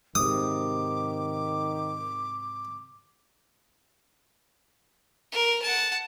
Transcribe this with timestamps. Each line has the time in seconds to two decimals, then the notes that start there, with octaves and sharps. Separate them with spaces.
0.15 G#2 C3 D#3 D6 D#6
5.32 A#4
5.62 F#5 A5